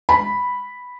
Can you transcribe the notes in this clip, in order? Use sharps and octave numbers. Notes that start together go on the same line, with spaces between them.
B5